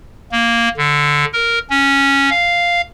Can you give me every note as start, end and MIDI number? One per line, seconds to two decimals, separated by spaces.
0.32 0.69 58
0.77 1.25 50
1.33 1.59 70
1.70 2.29 61
2.30 2.81 77